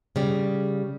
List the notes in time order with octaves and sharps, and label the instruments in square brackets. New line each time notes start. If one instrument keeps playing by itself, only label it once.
[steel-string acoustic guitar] C#3 G3